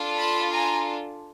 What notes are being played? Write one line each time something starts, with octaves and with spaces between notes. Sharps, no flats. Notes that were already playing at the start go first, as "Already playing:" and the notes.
Already playing: D4 F4 A4
A5 B5
G#5 A#5